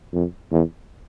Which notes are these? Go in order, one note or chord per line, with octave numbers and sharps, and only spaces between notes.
F2
E2